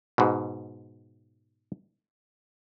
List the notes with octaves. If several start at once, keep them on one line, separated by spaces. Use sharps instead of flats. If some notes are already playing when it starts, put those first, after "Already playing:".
G#2 B2